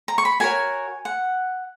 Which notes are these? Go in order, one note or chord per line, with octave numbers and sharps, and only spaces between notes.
A#5
C#6
B5
F#4 A#4 C#5 G#5
F#5